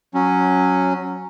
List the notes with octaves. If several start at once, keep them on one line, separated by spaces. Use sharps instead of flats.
F#3 C#4